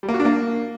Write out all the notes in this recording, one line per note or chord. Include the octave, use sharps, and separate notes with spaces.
G3
A#3
F#4
D4
A#3